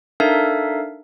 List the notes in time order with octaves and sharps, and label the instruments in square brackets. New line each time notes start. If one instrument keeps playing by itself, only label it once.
[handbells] D4 D#4 A4 A#4 E5 F5